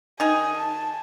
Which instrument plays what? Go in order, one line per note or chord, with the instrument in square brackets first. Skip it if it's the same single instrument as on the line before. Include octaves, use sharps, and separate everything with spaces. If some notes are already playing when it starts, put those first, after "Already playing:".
[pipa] D#3 D#4 G#4 [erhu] G#5
[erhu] A5